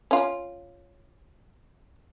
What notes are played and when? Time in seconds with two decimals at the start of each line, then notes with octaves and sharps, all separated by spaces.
0.11 C#4 F4